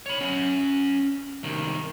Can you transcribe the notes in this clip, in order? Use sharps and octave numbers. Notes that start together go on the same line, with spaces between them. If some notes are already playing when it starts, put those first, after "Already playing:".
C#5 B5
C#4 F#5
C2 D#3